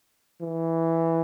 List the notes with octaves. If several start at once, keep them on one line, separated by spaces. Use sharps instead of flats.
E3